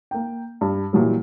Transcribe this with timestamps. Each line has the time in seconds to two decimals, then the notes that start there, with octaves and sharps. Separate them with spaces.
0.11 A#3 G5
0.61 G2
0.93 A#2 E3 F#3 G3